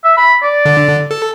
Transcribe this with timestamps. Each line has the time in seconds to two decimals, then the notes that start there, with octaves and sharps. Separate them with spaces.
0.04 E5
0.17 B5
0.43 D5
0.65 D3
1.11 A4